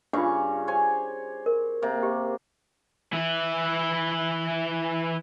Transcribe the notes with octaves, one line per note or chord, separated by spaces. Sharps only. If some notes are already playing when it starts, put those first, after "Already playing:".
G2 C#3 D4 F4 C#6
C5 C#5 G#5
A#4
C3 A#3
G4
E3 E4